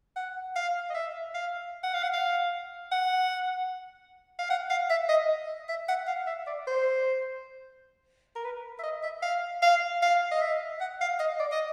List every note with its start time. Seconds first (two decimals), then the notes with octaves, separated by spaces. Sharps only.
0.16 F#5
0.56 F5
0.90 D#5
0.94 E5
1.34 F5
1.83 F#5
1.94 F5
2.03 F#5
2.13 F5
2.92 F#5
4.39 F5
4.50 F#5
4.70 F5
4.90 E5
5.09 D#5
5.69 E5
5.88 F#5
6.08 F5
6.27 E5
6.47 D5
6.67 C5
8.35 A#4
8.44 B4
8.79 E5
8.83 D#5
9.03 E5
9.22 F5
9.62 F5
10.02 F5
10.31 D#5
10.42 E5
10.80 F#5
11.01 F5
11.20 D#5
11.40 D5
11.52 D#5